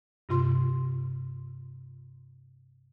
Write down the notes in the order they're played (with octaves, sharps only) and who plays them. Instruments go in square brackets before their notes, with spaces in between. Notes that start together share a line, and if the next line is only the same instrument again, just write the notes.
[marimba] G2 C3 F4 C6